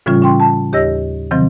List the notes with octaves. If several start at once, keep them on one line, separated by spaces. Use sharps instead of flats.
A2 C#3 E3 G3 C#4 F4
C#4 G5 C6
A5
D#2 G4 C#5 D#5 E6 A#6
C3 D#3 F3 F#3 C4